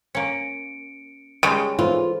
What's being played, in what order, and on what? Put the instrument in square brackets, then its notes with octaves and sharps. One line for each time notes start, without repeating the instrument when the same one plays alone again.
[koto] A#3 C#4 [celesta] C#7 D7
[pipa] C#3 [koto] G3 G#3 F4
[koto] E3 [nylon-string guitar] F4 [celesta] A4 C5